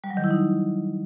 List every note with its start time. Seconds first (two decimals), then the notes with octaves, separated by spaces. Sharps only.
0.04 G3
0.10 F#3
0.17 D#3
0.24 E4
0.31 D#4